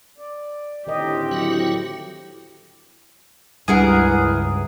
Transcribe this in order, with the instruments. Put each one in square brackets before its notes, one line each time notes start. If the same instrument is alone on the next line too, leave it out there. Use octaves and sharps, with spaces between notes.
[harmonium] D5
[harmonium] D2 A2 C4 [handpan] D#3 A#4 D#5 [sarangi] G4
[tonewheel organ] F#3 E4 F#4
[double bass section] C#2 [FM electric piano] G2 D#6 [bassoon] E3 [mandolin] G#4 A#4 F#5